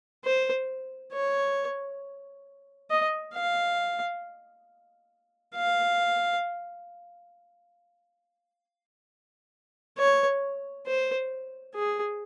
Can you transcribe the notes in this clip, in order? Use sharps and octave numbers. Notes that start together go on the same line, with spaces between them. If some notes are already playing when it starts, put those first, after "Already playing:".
C5
C#5
D#5
F5
F5
C#5
C5
G#4